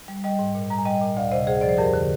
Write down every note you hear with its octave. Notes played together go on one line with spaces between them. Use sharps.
G3
G3 D#5 G5
G#2
A#2
G3 A#5
G#5
G3 D#5 G5
A#2
D2 D5 F5
C3 C5 D#5
D2 G#4 C5
F3 D5
C5
F2 G4 A#4
D3